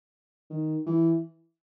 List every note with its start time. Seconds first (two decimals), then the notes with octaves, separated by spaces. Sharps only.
0.50 D#3
0.86 E3